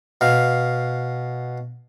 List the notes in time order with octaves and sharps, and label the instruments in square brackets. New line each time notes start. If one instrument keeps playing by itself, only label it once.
[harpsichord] B2 F5